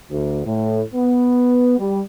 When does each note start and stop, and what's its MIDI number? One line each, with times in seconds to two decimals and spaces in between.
0.10 0.41 38
0.45 0.82 45
0.93 1.76 59
1.78 2.00 55